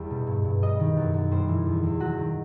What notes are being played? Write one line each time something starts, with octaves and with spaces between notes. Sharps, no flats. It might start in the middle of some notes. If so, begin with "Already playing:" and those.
Already playing: E2 G3
B2
G2
G2
G3 D#5
D#3
F#2
F#2
G3 C5
E3
E2
E2
F#3 F#4
D#3